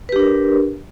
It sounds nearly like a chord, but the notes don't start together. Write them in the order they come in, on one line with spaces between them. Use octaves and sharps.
B4 G4 D4 A#4